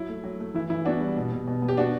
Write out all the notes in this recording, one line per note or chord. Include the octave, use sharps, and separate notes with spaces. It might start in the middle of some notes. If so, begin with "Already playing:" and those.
Already playing: F#3 E4
A3
F#3
A3
E3 E4
E3 E4
B3 D4 F#4
G3
B2
B2
B2
B3
G4
B3 D4 F#4